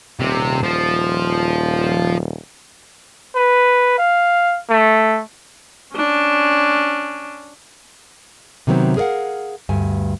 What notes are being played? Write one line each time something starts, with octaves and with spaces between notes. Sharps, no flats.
D#1 C3
F3
B4
F5
A3
C#4 D4
C3 D#3 F#3 B3 C4
G#4 A#4 C#5 F5 F#5
D2 G2 G#5